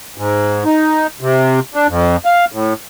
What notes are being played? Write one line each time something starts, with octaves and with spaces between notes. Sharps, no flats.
G#2
D#4
C3
D4
F2
F5
A2